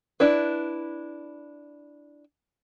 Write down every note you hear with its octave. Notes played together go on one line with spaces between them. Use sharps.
D4 E4 B4